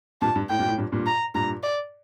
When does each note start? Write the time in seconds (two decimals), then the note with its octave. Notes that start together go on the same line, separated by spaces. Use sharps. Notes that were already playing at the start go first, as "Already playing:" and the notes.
0.21 G2 A#2 A5
0.36 G2
0.50 A2 G5
0.59 G2 A#2
0.68 A2
0.78 G2 A#2
0.92 G2 A#2
1.07 A#5
1.34 G2 A#2 A#5
1.63 D5